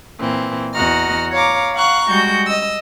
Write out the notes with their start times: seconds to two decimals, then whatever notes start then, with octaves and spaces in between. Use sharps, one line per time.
0.20 A#2 E3 C4
0.74 E2 F#4 D#5 F#5 A#5 F6
1.32 C#5 F5 A#5 D6
1.74 F5 F#5 A#5 C#6 F#6
2.08 G3 G#3 F#4 G6
2.47 D#5 E6